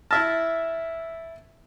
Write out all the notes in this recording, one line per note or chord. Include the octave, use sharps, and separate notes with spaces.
E4 E5 A5 F6 A6 A#6